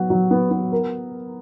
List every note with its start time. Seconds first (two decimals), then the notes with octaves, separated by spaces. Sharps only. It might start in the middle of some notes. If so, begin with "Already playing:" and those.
Already playing: F#3 B3 F#4
0.10 F#3
0.31 B3
0.51 B3
0.72 A#4